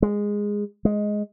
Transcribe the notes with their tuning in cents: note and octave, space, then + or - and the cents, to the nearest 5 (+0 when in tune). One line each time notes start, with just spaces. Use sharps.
G#3 -10
G#3 +5